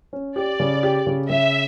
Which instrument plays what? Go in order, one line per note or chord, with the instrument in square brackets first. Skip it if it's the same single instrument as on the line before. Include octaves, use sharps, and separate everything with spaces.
[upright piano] C#4
[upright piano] G4 [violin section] D5
[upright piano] C#3
G4
C#3
[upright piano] C#3 [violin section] E5